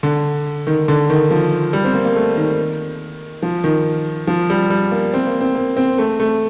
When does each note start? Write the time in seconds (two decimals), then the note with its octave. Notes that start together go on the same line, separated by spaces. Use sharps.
0.03 D3
0.67 D#3
0.88 D3
1.10 D#3
1.31 F3
1.73 G3
1.84 C4
1.94 A#3
2.05 A#3
2.16 A3
2.36 D#3
3.43 F3
3.64 D#3
4.27 F3
4.50 G3
4.70 G3
4.92 A#3
5.14 C4
5.27 A#3
5.41 C4
5.55 A#3
5.77 C4
5.98 A3
6.20 A3